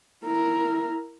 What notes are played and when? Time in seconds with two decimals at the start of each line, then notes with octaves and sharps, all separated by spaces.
0.25 E4 A#4